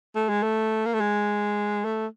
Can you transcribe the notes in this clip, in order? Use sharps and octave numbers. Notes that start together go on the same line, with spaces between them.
A3
G#3
A3
A#3
A3
G#3
A3